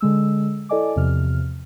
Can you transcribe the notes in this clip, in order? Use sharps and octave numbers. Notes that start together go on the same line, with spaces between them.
D3 G#3 E6
E4 A4 D5 D#5 G#5 D6
E2 C3 F3 F6